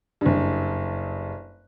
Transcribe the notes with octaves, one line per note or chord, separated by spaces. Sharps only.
F#1 G2